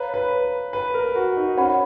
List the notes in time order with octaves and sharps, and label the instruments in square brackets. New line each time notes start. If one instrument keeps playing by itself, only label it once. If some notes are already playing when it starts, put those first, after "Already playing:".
Already playing: [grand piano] B4 [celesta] C#5 F5 A#5
[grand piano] B4
B4
A#4
F#4
D#4
[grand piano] C#4 [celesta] C#5 F#5 B5